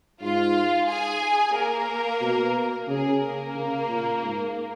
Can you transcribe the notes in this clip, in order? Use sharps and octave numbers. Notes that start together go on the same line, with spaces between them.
G#2 F4 F5
G#4 G#5
A#3 A#4
B2
C#3 G#4
A#3 A#4
C#3
A#2
G#2